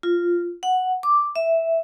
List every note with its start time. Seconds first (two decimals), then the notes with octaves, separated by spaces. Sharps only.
0.03 F4
0.63 F#5
1.03 D6
1.36 E5